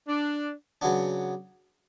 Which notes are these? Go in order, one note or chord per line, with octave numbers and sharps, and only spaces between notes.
D4
C#3 F#3 B3 D4